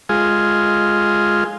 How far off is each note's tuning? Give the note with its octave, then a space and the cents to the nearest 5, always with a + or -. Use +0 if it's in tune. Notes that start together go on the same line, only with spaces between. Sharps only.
G#3 +0 F4 +0 G#4 +0